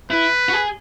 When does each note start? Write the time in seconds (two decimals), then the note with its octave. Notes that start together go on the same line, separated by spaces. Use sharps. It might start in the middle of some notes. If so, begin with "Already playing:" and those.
0.10 E4 B4
0.49 F#4
0.53 G#4